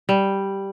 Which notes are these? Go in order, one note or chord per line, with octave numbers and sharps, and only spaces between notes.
G3